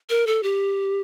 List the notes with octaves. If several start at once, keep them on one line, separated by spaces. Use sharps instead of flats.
A#4
A4
G4